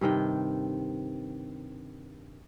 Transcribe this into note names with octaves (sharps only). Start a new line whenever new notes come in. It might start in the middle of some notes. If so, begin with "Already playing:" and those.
G2 C3 D#3 G5